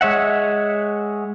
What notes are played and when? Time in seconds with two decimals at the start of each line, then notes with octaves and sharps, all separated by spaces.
0.01 G#3 C#5 E5 F#5